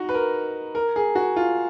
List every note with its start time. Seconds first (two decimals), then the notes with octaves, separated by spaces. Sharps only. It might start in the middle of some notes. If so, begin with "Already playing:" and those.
Already playing: D#4 F#4
0.09 B4
0.14 A#4
0.75 A#4
0.96 G#4
1.15 F#4
1.36 F4